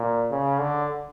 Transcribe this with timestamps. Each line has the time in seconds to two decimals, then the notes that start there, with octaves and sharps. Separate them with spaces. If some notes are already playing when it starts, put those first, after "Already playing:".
Already playing: A#2
0.31 C#3
0.60 D3